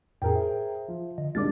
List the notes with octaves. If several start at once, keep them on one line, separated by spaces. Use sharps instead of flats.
F2 A2 G#4 A#4 G5
C5 E5
F3
D3 D#5
C2 G#2 D4 D6 F6 A6